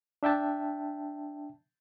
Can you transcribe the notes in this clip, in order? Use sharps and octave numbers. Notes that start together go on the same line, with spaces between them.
D4 E5 G5 A5